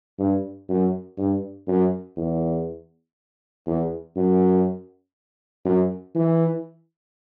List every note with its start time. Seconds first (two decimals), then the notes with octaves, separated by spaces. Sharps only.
0.19 G2
0.69 F#2
1.18 G2
1.68 F#2
2.17 E2
3.67 E2
4.16 F#2
5.65 F#2
6.15 E3